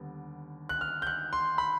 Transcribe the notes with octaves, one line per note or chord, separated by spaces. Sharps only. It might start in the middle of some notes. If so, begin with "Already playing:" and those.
Already playing: D#2 D3 G3 B3
F#6
F6
G6
F#6
C6
B5